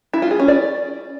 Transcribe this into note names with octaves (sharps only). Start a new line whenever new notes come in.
E4
F4
G#4
C#4
D5